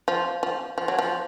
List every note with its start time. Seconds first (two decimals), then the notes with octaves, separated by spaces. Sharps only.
0.08 F3
0.43 F3
0.78 F3
0.88 F#3
0.99 F3